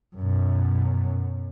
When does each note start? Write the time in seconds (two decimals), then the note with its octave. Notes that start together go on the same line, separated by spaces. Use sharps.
0.17 F#2 B2